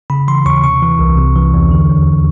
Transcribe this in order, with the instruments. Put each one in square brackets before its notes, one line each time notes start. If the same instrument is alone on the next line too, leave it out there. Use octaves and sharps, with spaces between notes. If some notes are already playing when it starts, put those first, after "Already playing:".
[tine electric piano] C#3 B5
E3 C6
D#2 C#6
C3 C#6
E3
C2
C3
E3
E2
D3
D#2